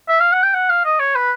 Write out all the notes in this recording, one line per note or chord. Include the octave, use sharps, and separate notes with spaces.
E5
F5
F#5
G5
F#5
F5
D#5
C#5
B4